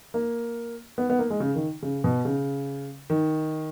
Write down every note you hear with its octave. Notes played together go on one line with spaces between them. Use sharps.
A#3
B3
B3
A#3
G#3
C#3
D#3
C#3
B2
C#3
D#3